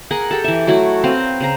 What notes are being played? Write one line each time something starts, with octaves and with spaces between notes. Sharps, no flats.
G#4 A#4 F#5 G#5
G4 A4
E3 E5
F#3 A3 E4 F#4
C4 B4 F5 A#5
C#3 C5 A#5